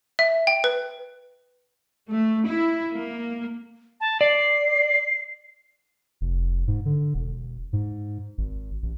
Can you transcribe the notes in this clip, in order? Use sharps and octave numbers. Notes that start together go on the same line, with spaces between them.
E5
G5
B4
A3
E4
A#3
A5
D5 C7
F1
G#2
D3
E1
G#2
G#1
A1